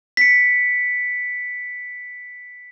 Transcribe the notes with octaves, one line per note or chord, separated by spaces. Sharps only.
B6 C#7